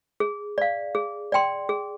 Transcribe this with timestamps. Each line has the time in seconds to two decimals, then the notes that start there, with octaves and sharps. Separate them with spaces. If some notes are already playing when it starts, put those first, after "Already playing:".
0.20 G#4
0.58 D5 F5
0.95 G#4
1.32 D5 G5 C6
1.69 G#4